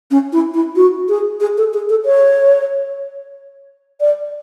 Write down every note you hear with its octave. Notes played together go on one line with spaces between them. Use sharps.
C#4
E4
E4
F#4
G#4
G#4
A4
G#4
A4
C#5
D5